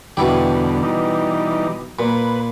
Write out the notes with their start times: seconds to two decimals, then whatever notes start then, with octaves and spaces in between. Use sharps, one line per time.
0.17 E2 B2 D3 G3 E4 G4
0.83 E3 G3 D#4
1.99 A#2 B4